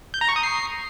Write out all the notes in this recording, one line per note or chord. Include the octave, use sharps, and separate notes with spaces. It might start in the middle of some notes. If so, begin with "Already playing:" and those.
G6
A#5
C#6
D#6
C7